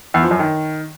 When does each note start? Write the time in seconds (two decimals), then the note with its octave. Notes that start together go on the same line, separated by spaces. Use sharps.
0.14 E2
0.23 F3
0.31 F#2
0.39 D#3